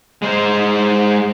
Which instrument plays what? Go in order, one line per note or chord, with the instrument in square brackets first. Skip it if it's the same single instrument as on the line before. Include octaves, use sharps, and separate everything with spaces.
[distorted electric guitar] G#3 C5